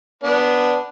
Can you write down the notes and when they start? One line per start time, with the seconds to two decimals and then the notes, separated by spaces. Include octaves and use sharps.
0.23 B3 D4